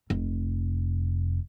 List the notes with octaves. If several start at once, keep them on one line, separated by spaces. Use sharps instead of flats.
F1